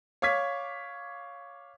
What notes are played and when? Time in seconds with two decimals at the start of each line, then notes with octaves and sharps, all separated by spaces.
0.22 C#5 F5 D6 G#6 B6